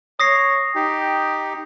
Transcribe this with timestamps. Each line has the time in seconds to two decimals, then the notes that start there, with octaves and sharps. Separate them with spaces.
0.20 C#5 D#6 A#6 C7
0.75 D#4 G4 G5